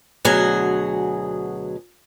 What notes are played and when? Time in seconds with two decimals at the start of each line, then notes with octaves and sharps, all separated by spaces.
0.25 D2 B2 F#3 G#4 G#5